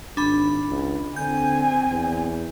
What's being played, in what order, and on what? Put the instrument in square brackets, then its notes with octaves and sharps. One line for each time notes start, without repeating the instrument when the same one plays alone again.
[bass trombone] G#1 [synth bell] D4 B5
[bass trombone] C#2
[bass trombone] D3 [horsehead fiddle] C4 G#5 [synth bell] G6
[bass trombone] E2